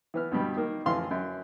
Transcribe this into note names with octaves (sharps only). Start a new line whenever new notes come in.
E3 B3 F6
G2 B2 G3
D#3 A#3
A1 F2 E3 F5 C6
F#2